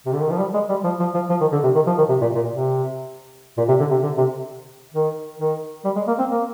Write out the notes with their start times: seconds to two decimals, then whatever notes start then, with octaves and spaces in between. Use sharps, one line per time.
0.06 C3
0.14 D3
0.23 D#3
0.30 F3
0.38 G3
0.54 G#3
0.69 G3
0.84 F3
1.00 F3
1.14 F3
1.30 F3
1.41 D#3
1.52 D3
1.64 C3
1.75 D#3
1.87 F3
1.98 D#3
2.09 C3
2.21 A#2
2.35 A#2
2.51 C3
3.58 A#2
3.68 C3
3.80 D3
3.91 C3
4.03 D3
4.18 C3
4.94 D#3
5.39 D#3
5.85 G3
5.96 G#3
6.07 A#3
6.19 C4
6.30 A#3